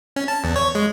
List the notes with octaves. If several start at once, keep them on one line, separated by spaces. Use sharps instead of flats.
C#4
A5
E2
C#5
G#3